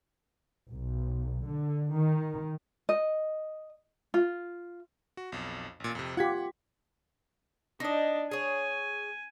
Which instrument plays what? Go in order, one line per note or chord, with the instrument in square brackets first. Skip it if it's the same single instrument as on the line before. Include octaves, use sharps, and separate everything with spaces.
[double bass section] B1
D3
D#3
[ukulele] D#5
F4
[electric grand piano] F#4
B1 F2
A1 A#2
F2 C3
[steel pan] F4 G4 [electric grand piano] F#5 G#6 B6
[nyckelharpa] D4 D5 [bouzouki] D#4 D#5
[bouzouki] G#4 C#5 [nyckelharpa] G#5